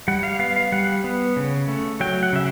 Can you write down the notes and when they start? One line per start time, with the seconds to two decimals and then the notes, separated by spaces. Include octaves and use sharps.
0.08 G3 F#5
0.23 F5
0.39 B3 F5
0.56 F5
0.72 G3 F#5
1.04 B3
1.36 C#3
1.68 A3
2.00 F#3 G5
2.23 F#5
2.33 C#3 E5